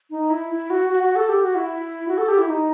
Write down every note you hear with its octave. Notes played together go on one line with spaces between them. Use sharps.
D#4
E4
E4
F#4
F#4
F#4
A4
G4
F#4
E4
F#4
A4
G4
E4
D#4